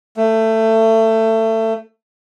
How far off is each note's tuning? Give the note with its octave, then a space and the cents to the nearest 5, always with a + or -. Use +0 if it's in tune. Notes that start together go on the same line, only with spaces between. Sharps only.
A3 +20